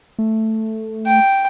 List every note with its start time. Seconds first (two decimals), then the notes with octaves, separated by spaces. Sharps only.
0.19 A3
1.07 G5